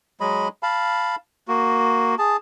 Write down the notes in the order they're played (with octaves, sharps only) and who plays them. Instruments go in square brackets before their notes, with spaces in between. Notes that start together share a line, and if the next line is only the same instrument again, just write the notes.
[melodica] F#3 G#3 D#5 B5
F5 A5 B5
A#3 F#4
G#4 A5